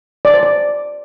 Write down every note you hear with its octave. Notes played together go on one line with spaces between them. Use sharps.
D5
C5
D5